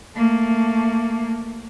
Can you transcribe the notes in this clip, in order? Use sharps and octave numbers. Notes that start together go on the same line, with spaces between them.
A3 A#3